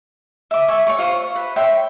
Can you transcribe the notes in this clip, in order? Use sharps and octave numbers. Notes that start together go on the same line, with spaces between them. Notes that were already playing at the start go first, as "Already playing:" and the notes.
E5 D6
E5 G#5 C#6
C#5 C#6
F4 C5 C#6
B4
C#5 E5 G5 C6